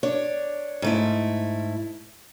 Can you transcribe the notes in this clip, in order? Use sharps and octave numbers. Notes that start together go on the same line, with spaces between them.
D4 C#5
G#2 A3 E4